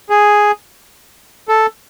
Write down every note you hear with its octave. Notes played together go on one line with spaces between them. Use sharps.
G#4
A4